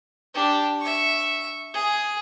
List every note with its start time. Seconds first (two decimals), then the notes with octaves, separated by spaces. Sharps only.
0.34 D4 G4
0.80 E5 C#6
1.74 G#4